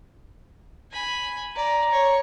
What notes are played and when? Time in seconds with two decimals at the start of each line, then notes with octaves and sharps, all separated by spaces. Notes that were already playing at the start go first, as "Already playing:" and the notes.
0.91 G#5 B5
1.56 D5 A#5
1.91 C#5